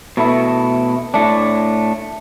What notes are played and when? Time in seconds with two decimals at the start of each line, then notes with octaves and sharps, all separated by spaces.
0.17 B2 A3 E4
1.14 A2 A3 D4